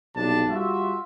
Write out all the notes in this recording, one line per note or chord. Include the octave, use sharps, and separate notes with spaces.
B1 G2 C3 D4 A5
G3 F4 F#4 E5